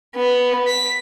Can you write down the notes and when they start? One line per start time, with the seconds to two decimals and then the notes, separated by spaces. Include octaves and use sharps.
0.16 B3
0.67 B6